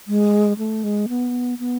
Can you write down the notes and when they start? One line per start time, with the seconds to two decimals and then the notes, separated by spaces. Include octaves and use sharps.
0.08 G#3
0.58 A3
0.84 G#3
1.09 B3
1.59 B3